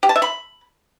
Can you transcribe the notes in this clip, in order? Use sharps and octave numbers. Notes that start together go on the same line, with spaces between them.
G4
A5
E5
B5